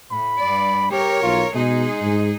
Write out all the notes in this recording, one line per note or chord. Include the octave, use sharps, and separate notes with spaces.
A2 B5
G2 D5
G4 A#4 C#5
B1 F4
B2 G#3 D#4 G#4
G#2